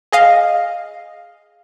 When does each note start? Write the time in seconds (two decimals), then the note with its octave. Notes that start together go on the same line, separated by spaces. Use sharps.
0.13 G#4 D#5 F5